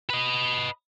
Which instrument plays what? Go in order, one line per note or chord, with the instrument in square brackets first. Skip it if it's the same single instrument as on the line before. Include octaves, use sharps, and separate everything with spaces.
[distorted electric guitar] B4 D#5